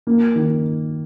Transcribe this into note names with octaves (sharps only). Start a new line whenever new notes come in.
A#3
D#3